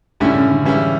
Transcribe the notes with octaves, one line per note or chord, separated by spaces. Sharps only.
F#2 A2 D3 G3 C#4 E4
C#3
D3
C#3 E3 G3 C#4 E4